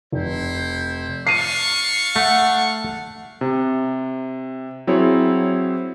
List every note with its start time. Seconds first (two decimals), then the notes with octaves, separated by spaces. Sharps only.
0.12 F1 E4 C5
1.27 D4 F5 C#6 C7 D#7
2.16 A3 F#5
3.41 C3
4.87 F#3 C4 E4 G#4 C#5